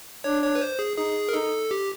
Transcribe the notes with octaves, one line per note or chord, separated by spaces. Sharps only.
D4 C#5
C#5
B4
C5
G#4
D#4 G#4
A#4
D#4 A4
G4